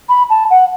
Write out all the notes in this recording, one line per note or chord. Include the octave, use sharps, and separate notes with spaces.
B5
A5
F#5